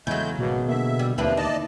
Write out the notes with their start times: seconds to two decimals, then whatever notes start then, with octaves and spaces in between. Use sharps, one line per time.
0.07 E2 C#3 F#3 G#3 A3 G6
0.39 D#1 G#1 B2 A#3
0.69 D3 A#3 E5
0.99 G3
1.18 D#2 F3 C4 D4 E4 B4
1.37 D#4 D5 D#5 A5